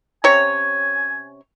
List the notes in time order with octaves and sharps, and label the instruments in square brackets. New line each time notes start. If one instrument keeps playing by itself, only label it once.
[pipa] C3 C#4 C#5 [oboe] G#5